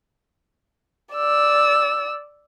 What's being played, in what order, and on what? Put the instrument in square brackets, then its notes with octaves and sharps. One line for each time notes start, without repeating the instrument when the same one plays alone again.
[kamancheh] D5 E6